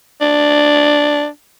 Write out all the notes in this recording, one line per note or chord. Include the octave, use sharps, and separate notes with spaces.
D4